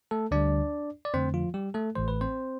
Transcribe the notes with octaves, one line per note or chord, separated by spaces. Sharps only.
A3 A4
D2 D3 G3 D4 D5
D5
F2 D3 A3 C4 C5
F3 F4
G3 G4
A3 A4
A1 A2 E3 A3 C5
B4
C4 C5